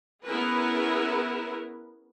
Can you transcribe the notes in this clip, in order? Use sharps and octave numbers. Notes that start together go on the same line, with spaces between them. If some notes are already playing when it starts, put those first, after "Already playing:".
B3 C#4 E4 G#4 A#4 B4